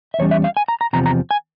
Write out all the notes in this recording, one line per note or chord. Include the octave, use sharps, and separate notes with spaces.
E5
E2 E3 G3 C#4 C#5
E5
F5
G#5
A#5
A#5
E2 C3 F3 A#5
A#5
G#5